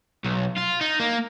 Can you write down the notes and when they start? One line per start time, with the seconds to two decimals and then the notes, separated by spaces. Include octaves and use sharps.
0.25 B1
0.58 F4
0.81 D#4
1.00 A#3